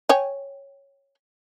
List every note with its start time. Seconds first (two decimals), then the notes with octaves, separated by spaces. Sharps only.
0.09 C#5 G5 G#5